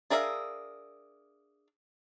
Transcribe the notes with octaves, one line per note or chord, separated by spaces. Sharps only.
D4 G#4 A#4 E5 F5